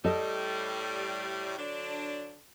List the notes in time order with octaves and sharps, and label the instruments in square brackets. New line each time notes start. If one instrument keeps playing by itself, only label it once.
[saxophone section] A2 G3 [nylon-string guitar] A4 D#5
[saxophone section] D3 F#3 D4